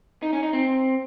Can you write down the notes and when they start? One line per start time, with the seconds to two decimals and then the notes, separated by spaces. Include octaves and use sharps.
0.23 D#4
0.33 C#4
0.43 D#4
0.53 C4